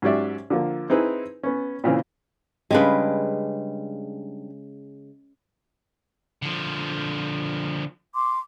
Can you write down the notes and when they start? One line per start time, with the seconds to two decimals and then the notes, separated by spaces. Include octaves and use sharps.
0.02 G#2 F#3 C#4 G4 D5 E5
0.50 D3 F3 A#3
0.90 C4 D#4 E4 G#4 B4
1.43 B3 C#4
1.84 A#2 C#3 E3 C4
2.71 C#3 G3 G#3 D4 B4
6.42 D3 F3
8.15 C6 D6